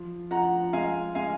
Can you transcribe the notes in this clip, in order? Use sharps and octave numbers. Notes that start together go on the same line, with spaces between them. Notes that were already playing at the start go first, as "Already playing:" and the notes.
Already playing: F3
F3 F#5 A#5
G#3 F5 G#5
G#3 F5 G#5